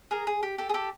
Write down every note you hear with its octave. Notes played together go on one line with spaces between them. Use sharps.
G#4 A#4
G#4
G4
G4 A4
G#4
G4 A4